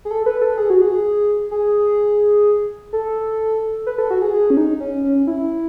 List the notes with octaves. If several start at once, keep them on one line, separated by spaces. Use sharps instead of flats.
G#4
A4
B4
A4
G#4
F#4
G#4
G#4
A4
B4
A4
F#4
G#4
G#4
C#4
D#4
C#4
C#4
E4